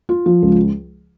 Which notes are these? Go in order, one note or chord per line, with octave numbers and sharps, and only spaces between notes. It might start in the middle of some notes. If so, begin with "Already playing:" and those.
F4
F3
C#2